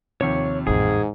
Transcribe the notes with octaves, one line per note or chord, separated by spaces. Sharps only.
D#2 C3 F3 C#5 C#6
A1 F2 G#2 G#4